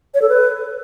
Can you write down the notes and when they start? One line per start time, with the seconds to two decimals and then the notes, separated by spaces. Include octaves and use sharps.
0.14 C#5
0.22 A4
0.29 B4